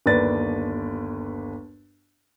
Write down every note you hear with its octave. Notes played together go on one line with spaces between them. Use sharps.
G1 D#2 B4 D5 A6